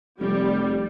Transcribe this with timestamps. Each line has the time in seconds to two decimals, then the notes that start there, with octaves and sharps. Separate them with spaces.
0.20 F1 G3